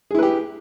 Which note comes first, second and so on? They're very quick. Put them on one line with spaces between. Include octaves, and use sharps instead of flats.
G#4 E4 B4 G4